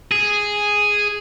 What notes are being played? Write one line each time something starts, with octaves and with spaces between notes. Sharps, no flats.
G#4